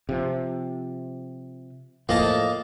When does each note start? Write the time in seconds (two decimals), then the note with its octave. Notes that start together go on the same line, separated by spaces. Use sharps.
0.09 C3 F3
2.09 A2 F3 A#3 D#5 A5